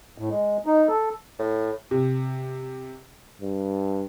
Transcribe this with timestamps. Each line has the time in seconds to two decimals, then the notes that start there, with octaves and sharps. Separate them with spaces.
0.18 A2
0.30 G#3
0.66 D#4
0.88 A4
1.39 A2
1.91 C3
3.42 G2